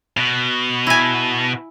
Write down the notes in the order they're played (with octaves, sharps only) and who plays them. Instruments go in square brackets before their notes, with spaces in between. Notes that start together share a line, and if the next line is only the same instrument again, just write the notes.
[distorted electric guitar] B2
[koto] E4 G#5